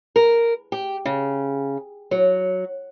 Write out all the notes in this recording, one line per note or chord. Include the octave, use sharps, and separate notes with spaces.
A#4
G4
C#3
F#3